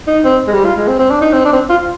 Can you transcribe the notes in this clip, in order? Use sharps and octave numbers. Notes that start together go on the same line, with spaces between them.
D#4
C4
G#3
G3
F4
G#3
C4
C4
D4
D#4
C4
D4
C4
F4